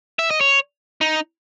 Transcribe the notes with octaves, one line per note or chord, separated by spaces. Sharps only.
E5
D#5
C#5
D#4